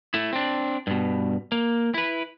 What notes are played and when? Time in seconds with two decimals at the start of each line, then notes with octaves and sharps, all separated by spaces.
0.14 A3 E4
0.33 C4 D4
0.87 G2 B2
1.52 A#3
1.94 E4 B4